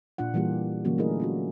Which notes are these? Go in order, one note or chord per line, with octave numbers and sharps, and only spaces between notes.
A#2 D4 F4 F#5
E3 G3 A#3 F4 G4 G#4
D3 E3 F#3 A#3 C#4 F#4
A3 D4 E4 G#4 A#4 D#5
C#4 F4 F#4